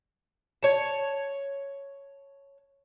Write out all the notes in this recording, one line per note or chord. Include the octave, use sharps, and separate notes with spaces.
C#5 A5